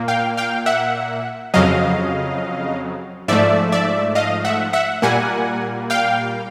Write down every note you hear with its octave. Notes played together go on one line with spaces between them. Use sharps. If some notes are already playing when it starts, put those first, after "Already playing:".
Already playing: A#2 A#3
F5 G5
F5 G5
E5 F#5
F2 C#3 F#3 D#5 F5
G#2 F3 A3 D5 E5
D5 E5
D#5 F5
E5 F#5
E5 F#5
A#2 G3 A#3 F#5 G#5
F5 G5